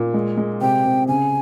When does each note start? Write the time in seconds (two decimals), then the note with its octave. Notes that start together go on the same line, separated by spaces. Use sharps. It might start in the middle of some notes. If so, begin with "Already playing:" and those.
Already playing: A#2
0.14 G#3
0.37 G#3
0.61 C3 G5
0.85 C3
1.08 C#3 G#5